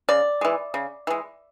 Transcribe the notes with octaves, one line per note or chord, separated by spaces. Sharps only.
C#3 D5
E3 G#3
C#3
E3 G#3